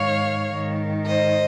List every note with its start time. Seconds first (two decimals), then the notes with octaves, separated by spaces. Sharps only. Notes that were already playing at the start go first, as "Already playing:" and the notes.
Already playing: G#2 D#3 C#5 F5
0.51 G#2 D#3
1.07 C5 D#5